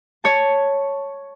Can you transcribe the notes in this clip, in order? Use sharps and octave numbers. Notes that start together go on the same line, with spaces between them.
C#5 A5